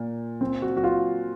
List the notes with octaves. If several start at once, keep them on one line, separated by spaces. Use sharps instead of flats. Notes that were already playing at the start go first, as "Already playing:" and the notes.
Already playing: A#2
C4
F#4
F#4
F4